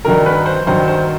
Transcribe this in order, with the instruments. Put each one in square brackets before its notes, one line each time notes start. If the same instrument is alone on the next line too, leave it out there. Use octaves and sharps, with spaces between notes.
[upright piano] G2 D#3 F#3 A#4
B4
C5
G2 D#3 F#3 C5
C5